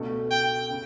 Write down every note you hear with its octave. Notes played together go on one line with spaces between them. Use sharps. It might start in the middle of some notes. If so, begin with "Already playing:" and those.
Already playing: C#2 B2 A3 D4 A4
G5
C#3